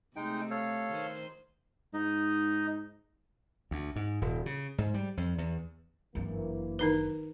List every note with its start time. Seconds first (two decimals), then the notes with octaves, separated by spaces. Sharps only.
0.16 C3 G#3 A3 D#4 G5
0.51 A4 C#5 F5
0.92 D#3 C5
1.94 G#2 D#4 D#5
3.71 D2
3.96 G#2
4.21 D#1
4.46 C#3
4.78 G#2
4.94 G3
5.17 F2
5.38 E2
6.15 G1 F#2 E3 A#3
6.79 D#3 D#4 B4